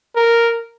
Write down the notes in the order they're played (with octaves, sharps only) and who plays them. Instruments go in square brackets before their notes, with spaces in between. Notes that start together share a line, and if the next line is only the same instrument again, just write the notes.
[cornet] A#4